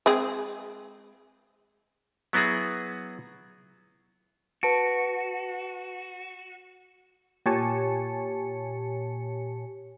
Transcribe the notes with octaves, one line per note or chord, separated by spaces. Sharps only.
G#3 C4 G#4
F#3 B3 E4 F#4 G#4
F#4 B4 A5 D7
A#2 G4 C#5 G#5 A5 C#7